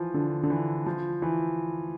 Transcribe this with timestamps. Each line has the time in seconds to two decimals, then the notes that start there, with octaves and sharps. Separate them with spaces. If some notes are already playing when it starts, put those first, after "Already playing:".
Already playing: E3 F3
0.14 D3
0.43 D3
0.50 E3
0.86 F3
1.22 E3